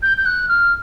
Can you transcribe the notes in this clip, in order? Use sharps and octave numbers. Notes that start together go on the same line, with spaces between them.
G6
G6
F#6
F6